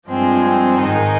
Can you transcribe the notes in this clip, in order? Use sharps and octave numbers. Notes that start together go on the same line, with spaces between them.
G2 F3 G#3 C4
C4
G#2 D#3 G#3 D#4